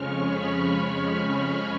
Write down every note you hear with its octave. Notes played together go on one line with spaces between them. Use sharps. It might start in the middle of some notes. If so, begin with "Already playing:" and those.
Already playing: F2 C#3 F3 G#3 C#4 C#6 F6
B5
C#6
C#6